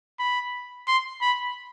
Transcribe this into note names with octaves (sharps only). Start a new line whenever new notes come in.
B5
C6
B5